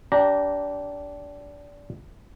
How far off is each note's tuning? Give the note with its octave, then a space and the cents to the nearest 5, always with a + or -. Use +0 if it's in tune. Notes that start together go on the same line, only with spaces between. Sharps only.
D4 -25 G4 -15 A#5 +0